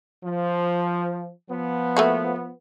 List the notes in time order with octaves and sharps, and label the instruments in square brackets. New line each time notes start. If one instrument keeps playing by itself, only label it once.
[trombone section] F3
F3 B3
[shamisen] A3 A#3 F#4